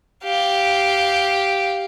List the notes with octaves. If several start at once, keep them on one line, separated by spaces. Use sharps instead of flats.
G4 F5